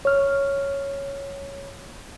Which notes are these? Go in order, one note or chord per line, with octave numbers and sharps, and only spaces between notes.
C#5 F6